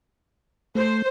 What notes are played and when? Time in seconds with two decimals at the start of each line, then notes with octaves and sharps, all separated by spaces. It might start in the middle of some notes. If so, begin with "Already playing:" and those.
0.75 A3 C5